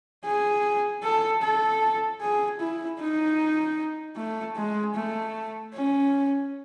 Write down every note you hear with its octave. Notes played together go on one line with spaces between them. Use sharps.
G#4
A4
A4
G#4
E4
D#4
A3
G#3
A3
C#4